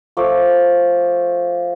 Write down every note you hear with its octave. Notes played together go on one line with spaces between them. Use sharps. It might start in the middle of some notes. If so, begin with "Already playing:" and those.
F3 A3 D6